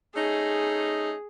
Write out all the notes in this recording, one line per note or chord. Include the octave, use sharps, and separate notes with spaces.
A3 C#4 D#4 G#4